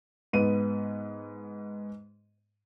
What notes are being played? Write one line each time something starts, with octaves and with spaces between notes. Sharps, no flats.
G#2 B3 D#7